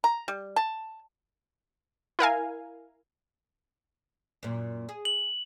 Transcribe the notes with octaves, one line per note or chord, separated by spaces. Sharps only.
A#5
G3
A5
E4 A#4 F5 G#5
F#2 A#2
G#4
F#7